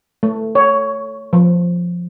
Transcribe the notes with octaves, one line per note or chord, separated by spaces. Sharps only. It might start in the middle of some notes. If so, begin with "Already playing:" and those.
A3
C#5
F3